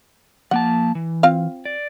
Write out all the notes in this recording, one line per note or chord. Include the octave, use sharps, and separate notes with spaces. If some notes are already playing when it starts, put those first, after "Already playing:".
F3 A#3 F#5 A5
E3
C4 F4 F5
D5